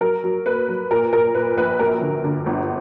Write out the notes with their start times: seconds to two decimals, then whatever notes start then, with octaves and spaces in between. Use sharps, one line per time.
0.01 F#3 A#4
0.24 F#3
0.46 A#3 B4
0.69 F#3
0.91 A#2 A#4
1.13 A#2 A#4
1.35 A#2 B4
1.57 A#1 B4
1.79 F#2 A#4
2.01 D3
2.24 D3
2.46 G1